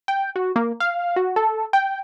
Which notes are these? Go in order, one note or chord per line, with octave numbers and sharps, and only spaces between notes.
G5
F#4
A#3
F5
F#4
A4
G5